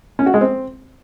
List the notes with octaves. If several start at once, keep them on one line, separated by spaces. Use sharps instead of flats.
C#4
F#4
G#3
C4